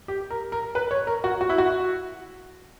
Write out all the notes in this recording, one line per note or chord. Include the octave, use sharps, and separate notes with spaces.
G4
A#4
A#4
B4
C#5
A#4
F#4
F#4
E4
F#4